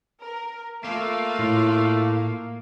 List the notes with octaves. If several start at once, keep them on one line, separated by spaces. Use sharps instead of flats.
A#4
A3 A#3 F4 F5
A2